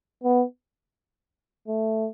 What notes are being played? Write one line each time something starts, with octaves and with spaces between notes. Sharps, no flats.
B3
A3